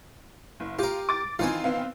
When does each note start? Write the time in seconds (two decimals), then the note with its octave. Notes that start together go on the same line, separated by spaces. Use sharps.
0.60 F#1
0.79 F4 G4 A#4
1.09 D6 A6
1.39 D#3 E3 C4 F4 G#5
1.64 B3 C4 F5